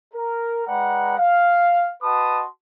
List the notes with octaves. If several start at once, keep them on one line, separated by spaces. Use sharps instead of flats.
A#4
G#3 B4 D5 F#5 G5 A#5
F5
F#4 B4 D#5 A5 C6 D#6